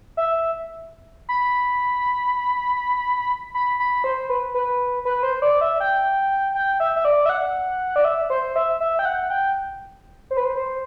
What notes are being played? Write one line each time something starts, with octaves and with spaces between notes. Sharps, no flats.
E5
B5
B5
B5
C5
B4
B4
B4
C5
D5
E5
G5
G5
E5
E5
D5
E5
F#5
D5
E5
C5
E5
E5
G5
F#5
G5
C5
B4
C5
C5